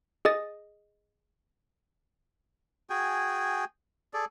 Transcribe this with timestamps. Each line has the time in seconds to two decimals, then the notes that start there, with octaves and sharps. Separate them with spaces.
0.25 G#4 D#5 D#6 A6
2.90 F#4 G#4 G5 G#5
4.14 G#4 A4 D5